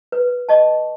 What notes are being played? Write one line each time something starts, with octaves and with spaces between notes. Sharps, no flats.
B4
D#5 A5 C#6